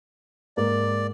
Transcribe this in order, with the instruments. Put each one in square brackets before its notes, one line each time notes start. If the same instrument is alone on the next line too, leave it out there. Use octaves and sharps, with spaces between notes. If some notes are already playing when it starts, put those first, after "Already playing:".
[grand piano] G#2 A#3 [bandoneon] D5